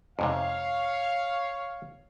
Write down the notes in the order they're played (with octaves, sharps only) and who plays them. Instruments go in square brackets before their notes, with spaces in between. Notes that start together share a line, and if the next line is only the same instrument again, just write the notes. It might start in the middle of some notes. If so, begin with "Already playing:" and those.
[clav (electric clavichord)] F2 G#2 C3 [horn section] C#5 F5